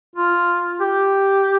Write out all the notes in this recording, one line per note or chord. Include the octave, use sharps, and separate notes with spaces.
F4
G4